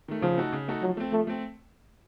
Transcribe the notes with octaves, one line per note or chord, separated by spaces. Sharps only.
D#3 A3
C#3 F3
A3 D#4 F#4 A4
C#3
A3 D#4 F#4 A4
F3 F#3
A3 C4
F3 A3
A3 C4